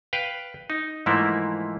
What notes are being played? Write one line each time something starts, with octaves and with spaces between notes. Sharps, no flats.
B4 F5 G5
D#4
G#2 E3 F3 A3 A#3 E4